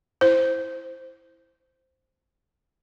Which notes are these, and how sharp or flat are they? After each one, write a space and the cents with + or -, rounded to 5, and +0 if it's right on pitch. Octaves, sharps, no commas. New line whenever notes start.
E4 +5 C5 +0